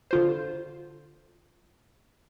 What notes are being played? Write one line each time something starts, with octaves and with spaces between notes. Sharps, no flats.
D3 F4 C5